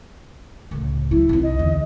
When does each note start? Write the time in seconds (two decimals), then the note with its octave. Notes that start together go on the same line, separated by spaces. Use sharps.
0.71 C#2 A2
1.11 F#3 E4
1.29 C2 D#4
1.43 D#5
1.59 E2 D3